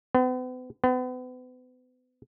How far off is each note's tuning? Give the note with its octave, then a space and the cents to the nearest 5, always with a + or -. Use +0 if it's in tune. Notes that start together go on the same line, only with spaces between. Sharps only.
B3 +45
B3 +40